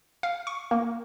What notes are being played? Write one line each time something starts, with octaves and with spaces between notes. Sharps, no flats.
F5
C#6
A#3